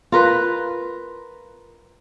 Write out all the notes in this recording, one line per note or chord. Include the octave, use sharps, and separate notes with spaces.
F4 A#4 B4